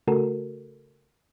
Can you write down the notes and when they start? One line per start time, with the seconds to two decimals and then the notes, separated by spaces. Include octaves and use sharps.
0.07 C#3 A3 F#4 A4 A#4